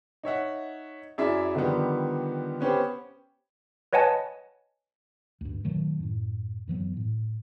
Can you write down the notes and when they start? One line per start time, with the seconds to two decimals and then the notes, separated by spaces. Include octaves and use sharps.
0.23 D#4 C#5 E5 F#5
1.18 F#2 E4 G#4 D5 E5
1.55 D3 D#3 F3 G3 B3
2.61 B3 C#4 G4 B4 C5
3.93 B4 C#5 D#5 F#5 G#5 A5
5.41 D2 G2
5.64 A#2 D#3 F#3 A3
6.00 F#2 A2
6.68 F#2 E3 F#3 B3
6.97 A2